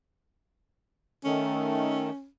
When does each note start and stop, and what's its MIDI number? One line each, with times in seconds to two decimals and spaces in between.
1.25 2.10 51
1.25 2.10 57
1.25 2.27 61